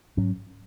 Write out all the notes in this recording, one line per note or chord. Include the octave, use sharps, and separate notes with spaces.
G#2 F#3 C#4